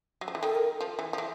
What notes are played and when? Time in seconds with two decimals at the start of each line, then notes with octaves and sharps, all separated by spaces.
0.21 F#3
0.28 F3
0.35 E3
0.43 D#3 A4
0.55 A#4
0.81 F3
0.99 E3
1.13 F3
1.18 E3